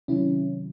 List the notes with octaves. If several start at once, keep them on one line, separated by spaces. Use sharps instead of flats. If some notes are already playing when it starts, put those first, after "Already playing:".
C3 D#3 F#3 C#4 E4